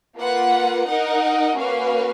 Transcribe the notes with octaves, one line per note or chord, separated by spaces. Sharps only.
A#3 F4 B4 F#5
D#4 A#4 D#5 F#5
A#3 C#4 F#4 B4 F5